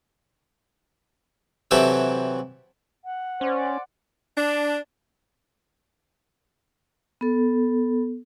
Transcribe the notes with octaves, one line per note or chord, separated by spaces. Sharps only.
C3 E3 F#3 E4 G4 A4
F#5
C#4 C5 D5
D4
B3 A4